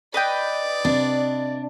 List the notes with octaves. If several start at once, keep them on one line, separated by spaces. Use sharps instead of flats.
B4 D5 D#5 G5
C3 D4